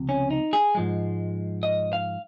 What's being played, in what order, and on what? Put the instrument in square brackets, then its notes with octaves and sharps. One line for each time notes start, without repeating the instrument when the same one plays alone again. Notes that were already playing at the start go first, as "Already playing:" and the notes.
Already playing: [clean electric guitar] C#2 C3 F3
C#4
D#4
G#4
G#2 F3 G#3
D#5
F5